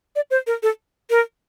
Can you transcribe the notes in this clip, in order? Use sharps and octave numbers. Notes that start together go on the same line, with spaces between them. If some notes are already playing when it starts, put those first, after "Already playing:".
D5
C5
A#4
A4
A#4